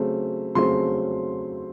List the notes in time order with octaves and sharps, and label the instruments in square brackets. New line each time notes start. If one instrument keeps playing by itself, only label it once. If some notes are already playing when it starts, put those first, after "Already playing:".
Already playing: [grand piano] C#3 F#3 A3 C4
C#3 F#3 A3 C4 C6